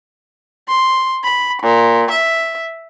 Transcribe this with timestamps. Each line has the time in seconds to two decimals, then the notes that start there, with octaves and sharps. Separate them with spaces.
0.68 C6
1.24 B5
1.63 A#2
2.11 E5